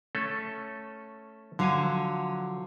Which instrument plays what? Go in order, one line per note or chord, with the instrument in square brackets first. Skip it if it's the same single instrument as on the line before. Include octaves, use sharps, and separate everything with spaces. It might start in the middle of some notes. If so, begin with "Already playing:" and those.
[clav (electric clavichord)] A3 C#4 A4
[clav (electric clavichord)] D3 F5 G#5 [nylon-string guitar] F3 F#3